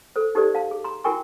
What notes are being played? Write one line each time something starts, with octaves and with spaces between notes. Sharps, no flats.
A4 C5
D#4 G4 A4 C5 D5
F5 A5
G#4
A#5 C6
E4 F#4 A#4 G5 G#5 C#6